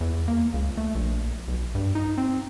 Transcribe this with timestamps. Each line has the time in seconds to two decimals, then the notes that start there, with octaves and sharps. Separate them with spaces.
0.01 E2
0.28 A#3
0.54 C#2
0.77 A3
0.95 A#1
1.48 B1
1.75 G2
1.95 D#4
2.18 C4